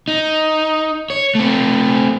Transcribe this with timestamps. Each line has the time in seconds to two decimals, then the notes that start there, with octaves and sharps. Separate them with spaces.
0.08 D#4
1.10 C#5
1.35 A3 C4